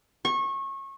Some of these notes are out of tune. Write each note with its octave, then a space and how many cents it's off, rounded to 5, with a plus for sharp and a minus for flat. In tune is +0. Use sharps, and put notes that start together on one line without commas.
C#6 -25